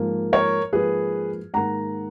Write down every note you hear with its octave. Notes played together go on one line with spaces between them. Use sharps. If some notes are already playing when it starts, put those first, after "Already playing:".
Already playing: G#2 F3 A#3
A#4 C#5
G#2 F3 A#3 G#4 B4
G#2 D#3 A#3 F#5 A#5